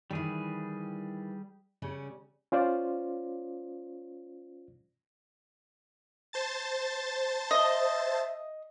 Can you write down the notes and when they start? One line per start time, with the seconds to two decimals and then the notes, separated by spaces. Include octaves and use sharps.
0.11 D#3 E3 G3 G#4
1.82 C#3 G3 C#4
2.52 C#4 F4 C5 D5
6.33 C5 A5 A6
7.51 D#5 E5